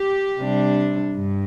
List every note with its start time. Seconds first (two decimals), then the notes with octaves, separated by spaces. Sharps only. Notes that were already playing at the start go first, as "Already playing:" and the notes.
Already playing: G4
0.38 C3 G3 D4
1.15 G2